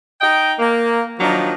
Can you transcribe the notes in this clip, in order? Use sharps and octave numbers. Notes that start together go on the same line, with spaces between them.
D#4 D#5 G5
A#3
D#3 F3 F#3 D4 D#4